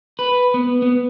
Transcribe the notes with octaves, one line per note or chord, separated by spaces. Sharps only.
B4
B3
B3